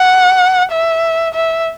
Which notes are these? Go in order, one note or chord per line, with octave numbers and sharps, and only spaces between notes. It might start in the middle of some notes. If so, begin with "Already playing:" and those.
Already playing: F#5
E5
E5